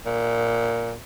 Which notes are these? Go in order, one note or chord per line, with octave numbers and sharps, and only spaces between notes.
A#2